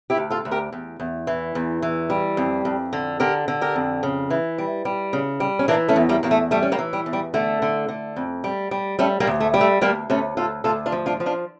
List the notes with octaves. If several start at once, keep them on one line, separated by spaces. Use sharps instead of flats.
E4 G4
D2
F4 A4
D2
G4 A#4
E2
E2
E3
E2
E3
G3
F2
F2
D3
D3 G4 A#4
D3
G4 A#4
F2
C#3
E3
G3
G3
C#3
G3
C#4
E3 A#3 D4
A3 C#4
E2
G3 A#3
E2 A#3
A3
G3 A3
C#4
G3 A#3
E3
G3
E2
G3
D3 A3
D3
D3
F2
G3
G3
G3 A3 C#4
G3 A#3
D2
A3
G3
A3
D2 G3 A#3
D2 A3 C#4
D2 F4 A4
D2 F4 A4
D4 F4
F3
D4 F4
F3
D4 F4